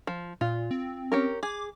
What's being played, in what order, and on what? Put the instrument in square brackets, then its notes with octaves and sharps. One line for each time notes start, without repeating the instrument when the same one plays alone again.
[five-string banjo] F3
[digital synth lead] A#2 [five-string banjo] F4
[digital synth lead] C4
[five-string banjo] C#4 G4 A#4
[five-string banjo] G#4 [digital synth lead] D6